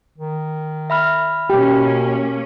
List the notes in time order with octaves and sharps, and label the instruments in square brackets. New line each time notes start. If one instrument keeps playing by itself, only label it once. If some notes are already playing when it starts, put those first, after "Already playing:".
[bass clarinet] D#3
[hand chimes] E5 B5 F6
[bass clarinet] B2 [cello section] A#3 C#4 [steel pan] G4